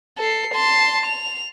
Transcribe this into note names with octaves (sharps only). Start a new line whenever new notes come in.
A4 C7
A5 C6
F7